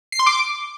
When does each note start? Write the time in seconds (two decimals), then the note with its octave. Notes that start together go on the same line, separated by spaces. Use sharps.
0.12 C7
0.19 C6
0.26 D6